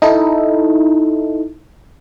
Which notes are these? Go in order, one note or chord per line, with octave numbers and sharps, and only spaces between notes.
D#4 E4 A4